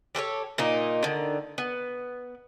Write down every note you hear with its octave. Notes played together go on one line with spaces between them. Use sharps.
G4 A4 B4 C#5
A#2 A#3 D#4
D3 D#3
B3